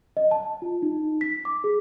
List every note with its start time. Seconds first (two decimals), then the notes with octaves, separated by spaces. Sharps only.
0.17 D#5
0.31 A5
0.62 F4
0.82 D#4
1.21 B6
1.45 D6
1.64 G#4